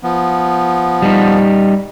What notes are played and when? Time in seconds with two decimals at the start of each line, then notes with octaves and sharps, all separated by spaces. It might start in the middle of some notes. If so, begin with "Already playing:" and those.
0.03 F3 B3
1.02 G3 D#4